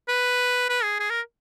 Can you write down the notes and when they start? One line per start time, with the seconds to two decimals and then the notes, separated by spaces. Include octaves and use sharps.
0.08 B4
0.69 B4
0.83 G#4
1.00 G#4
1.10 A#4